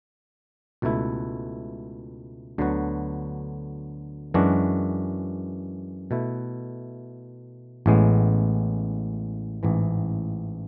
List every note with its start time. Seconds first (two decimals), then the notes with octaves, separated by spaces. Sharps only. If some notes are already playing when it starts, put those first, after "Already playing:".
0.82 C#2 B2 A3 E4
2.58 D2 D3 F#3 B3 F#4
4.34 F#2 E3 G#3 D4 F#4
6.11 B2 A3 E4
7.86 A1 A2 G#3 B3
9.63 A1 G#2 E3